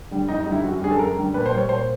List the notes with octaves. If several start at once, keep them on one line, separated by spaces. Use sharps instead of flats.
D3 G3
F#2 D#4
D#4
D3 G3
E4
F#2 F#4
D3 G3 G#4
A4
F#2 A#4
D3 G3
A#2 B4
C5
G3
C#5
A#2 C5